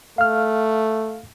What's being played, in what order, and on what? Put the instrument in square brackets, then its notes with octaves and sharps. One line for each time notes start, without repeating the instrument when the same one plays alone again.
[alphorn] A3 [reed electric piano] F5 F6